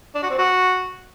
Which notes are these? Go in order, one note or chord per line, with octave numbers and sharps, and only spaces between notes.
D4
F#4
C4
F#4